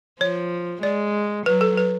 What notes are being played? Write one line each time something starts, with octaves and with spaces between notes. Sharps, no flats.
F3 C#5
G#3 D5
F#3 B4
A4
B4